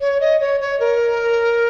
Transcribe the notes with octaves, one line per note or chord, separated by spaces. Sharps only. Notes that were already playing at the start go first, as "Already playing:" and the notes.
C#5
D#5
C#5
C#5
A#4